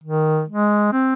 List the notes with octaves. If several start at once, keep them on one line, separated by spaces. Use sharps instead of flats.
D#3
G#3
C4